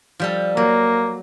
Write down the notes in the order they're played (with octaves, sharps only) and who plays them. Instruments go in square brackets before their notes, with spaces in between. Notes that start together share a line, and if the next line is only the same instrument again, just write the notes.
[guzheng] F3 G3 A4
[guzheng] F#3 [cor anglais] A#3